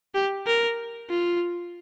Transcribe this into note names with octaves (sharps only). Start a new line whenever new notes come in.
G4
A#4
F4